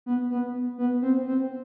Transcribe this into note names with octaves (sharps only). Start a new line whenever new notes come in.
B3
B3
B3
C4
C4